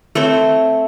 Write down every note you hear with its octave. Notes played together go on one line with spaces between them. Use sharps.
A3 C4 C#5